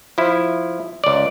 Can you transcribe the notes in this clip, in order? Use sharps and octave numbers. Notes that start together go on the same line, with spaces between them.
F3 E4
C#2 D5